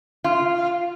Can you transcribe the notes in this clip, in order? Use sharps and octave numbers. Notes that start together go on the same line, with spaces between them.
F4